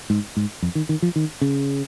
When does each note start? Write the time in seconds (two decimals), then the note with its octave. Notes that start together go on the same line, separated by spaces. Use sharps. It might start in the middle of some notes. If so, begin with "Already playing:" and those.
0.10 G#2
0.37 G#2
0.62 F2
0.75 D#3
0.89 D#3
1.02 F3
1.16 D#3
1.41 C#3